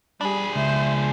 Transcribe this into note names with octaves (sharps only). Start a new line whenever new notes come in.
G3 D4 G#4 B5
C#2 C5 E5